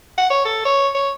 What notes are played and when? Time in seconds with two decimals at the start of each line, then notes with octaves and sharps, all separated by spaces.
0.18 F#5
0.30 C#5
0.45 A4
0.65 C#5
0.95 C#5